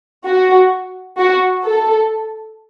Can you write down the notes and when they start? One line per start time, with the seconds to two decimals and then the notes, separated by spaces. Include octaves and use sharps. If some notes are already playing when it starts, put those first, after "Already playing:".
0.26 F#4
1.18 F#4
1.64 A4